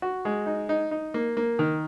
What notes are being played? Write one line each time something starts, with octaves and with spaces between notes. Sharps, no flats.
F#4
G#3
D#4
D#4
D#4
A#3
A#3
D#3